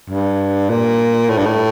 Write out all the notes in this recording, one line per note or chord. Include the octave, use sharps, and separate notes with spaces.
G2
A#2
A2
G2
A2